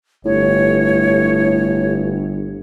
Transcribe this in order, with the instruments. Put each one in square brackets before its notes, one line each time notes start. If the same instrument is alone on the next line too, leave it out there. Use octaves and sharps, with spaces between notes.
[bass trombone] G1 [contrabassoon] A2 [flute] C#5